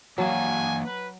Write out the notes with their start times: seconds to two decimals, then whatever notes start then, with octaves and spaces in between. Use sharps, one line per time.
0.18 E3 F#3 A#3 D4 F5 G#5
0.84 B4